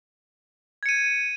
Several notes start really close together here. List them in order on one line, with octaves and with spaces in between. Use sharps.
G#6 C#7 D#7